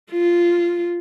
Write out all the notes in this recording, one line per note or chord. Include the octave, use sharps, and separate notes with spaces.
F4